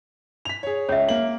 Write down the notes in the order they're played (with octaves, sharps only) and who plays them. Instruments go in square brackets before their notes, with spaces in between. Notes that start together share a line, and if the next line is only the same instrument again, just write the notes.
[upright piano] B6 F7
G#4 C#5
[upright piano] C#2 [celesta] C#5 E5
[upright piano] A#3 F#7